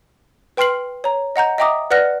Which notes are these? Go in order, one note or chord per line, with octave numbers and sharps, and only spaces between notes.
B4 G5 C6 F6 C7 F#7
C#5 A#5
D#5 F#5 A#5 G6
D#5 E5 G5 A#5 D6 D#6
B4 D5 F#5 F6 F#6 A#6